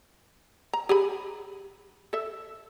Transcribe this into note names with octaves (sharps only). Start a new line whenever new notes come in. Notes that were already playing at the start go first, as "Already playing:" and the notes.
A#5
G4 G#4 B5
A4 E5